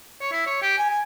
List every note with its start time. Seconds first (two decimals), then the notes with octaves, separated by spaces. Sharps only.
0.21 C#5
0.32 E4
0.46 C#5
0.62 G4
0.78 G#5
0.90 G#5